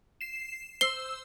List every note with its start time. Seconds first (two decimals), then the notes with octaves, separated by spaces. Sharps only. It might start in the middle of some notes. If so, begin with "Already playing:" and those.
0.21 C7 E7
0.81 C5 E6 C7 G7